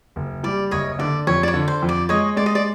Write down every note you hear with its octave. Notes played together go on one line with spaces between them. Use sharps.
F#1
G3 D5
F#1 C#5 D#5
D3 D5
F2 C#5
D5
C#5
D3
C5
F2
D5
G#3 C#5 D#5
G#3 D5
D#5
D5